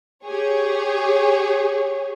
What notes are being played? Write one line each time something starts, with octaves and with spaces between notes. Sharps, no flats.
G4 G#4 C#5